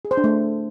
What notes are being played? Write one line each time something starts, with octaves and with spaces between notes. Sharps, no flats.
G#4
C5
D4
A3